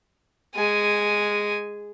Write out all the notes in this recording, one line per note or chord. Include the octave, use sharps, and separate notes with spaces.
G#3 G#5